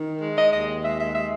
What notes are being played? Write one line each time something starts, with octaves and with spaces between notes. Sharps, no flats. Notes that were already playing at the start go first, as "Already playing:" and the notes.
Already playing: D#3
G#3
D#5
D#2 D#5
G#3 E5
E5
G#3 E5